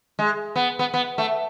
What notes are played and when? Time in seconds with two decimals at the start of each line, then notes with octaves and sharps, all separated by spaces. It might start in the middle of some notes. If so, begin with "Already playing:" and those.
0.19 G#3
0.56 B3
0.79 B3
0.94 B3
1.18 A3